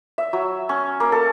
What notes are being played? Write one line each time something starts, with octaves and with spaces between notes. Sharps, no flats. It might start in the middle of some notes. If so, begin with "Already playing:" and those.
E5
F#3
C#4
A#3
A4